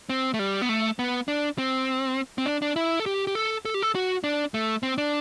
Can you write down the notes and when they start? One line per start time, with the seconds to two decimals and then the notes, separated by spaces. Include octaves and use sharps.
0.09 C4
0.34 A3
0.39 G3
0.62 B3
0.69 A3
0.99 B3
1.28 D4
1.58 C4
2.38 C4
2.46 D4
2.62 D4
2.76 E4
3.00 A4
3.06 G4
3.27 G4
3.35 A4
3.65 A4
3.74 G4
3.82 A4
3.95 F#4
4.24 D4
4.54 A3
4.83 C4
4.98 D4